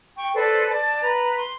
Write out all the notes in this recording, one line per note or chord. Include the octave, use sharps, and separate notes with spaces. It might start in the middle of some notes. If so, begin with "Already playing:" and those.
G5 C#6
A4 B4 C5 D5
D5 A5
B4 A#5
C6